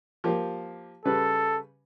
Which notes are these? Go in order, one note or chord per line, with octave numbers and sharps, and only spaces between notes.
F3 A#3 G4
C#3 G3 A4 B4